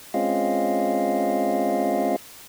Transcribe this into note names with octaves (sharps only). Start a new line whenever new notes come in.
G#3 C4 C#4 F4 D#5 F5